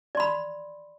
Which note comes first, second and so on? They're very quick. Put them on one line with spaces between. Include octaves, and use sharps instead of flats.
D5 C6 B5